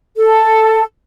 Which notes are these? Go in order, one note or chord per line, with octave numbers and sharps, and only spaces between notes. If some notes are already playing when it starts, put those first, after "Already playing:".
A4